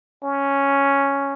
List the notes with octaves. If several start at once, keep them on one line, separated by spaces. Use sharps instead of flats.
C#4